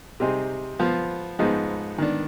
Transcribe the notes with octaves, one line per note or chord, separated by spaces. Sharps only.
C3 G3 C4 D#4 G#4
F3 B3 F4
G#2 F3 G#3 B3 D#4
D#3 B3 D4